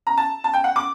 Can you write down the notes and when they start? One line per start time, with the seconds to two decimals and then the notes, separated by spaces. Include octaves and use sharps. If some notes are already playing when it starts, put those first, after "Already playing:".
0.07 A#5
0.17 A5
0.44 A5
0.53 G5
0.64 F#5
0.76 D6